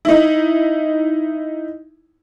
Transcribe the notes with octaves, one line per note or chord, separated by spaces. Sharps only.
D#4 E4